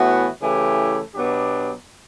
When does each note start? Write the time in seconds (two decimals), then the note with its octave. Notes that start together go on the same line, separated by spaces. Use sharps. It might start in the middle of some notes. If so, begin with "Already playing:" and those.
Already playing: A2 E3 B3 F#4
0.42 C#3 E3 A3 E4 G4
1.15 B2 F#3 B3 D4 G4